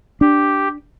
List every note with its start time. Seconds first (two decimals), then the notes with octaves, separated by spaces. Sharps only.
0.21 D4 G4